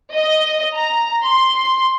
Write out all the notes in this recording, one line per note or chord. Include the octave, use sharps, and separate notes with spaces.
D#5
A#5
C6